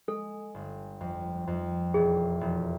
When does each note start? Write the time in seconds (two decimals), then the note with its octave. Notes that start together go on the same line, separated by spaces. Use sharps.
0.08 G#3 A4
0.54 G1
1.00 F2
1.47 F2
1.94 E1 G#4
2.41 E1